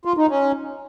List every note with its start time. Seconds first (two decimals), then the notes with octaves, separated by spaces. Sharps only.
0.05 F4
0.17 D#4
0.29 C#4